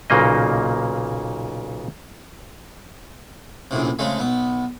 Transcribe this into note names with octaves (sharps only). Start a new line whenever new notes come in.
B1 A#2 C#3 A#3 D#5
A#1 F#2 A2 C3
F2 C#3 G#3 A3
B1 B3